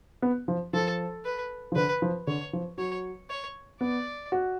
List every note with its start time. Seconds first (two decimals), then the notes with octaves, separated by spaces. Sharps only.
0.22 B3
0.48 F3
0.73 F3 A4
1.25 B4
1.72 F3
1.75 D3 B4
2.02 F3
2.27 D3 C#5
2.53 F3
2.78 F#3 C#5
3.30 C#5
3.81 B3 D5
4.32 F#4